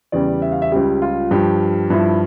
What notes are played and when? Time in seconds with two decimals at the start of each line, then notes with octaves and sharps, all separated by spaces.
0.12 E2 C#3 G3 D5
0.42 E5
0.52 F5
0.62 E5
0.71 C#2 C#3 G3 G4
1.02 F4
1.31 G2 F3 G4
1.90 G2 F3 E4